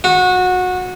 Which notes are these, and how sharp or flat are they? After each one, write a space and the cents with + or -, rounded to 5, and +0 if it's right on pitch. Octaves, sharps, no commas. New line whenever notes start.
F#4 -20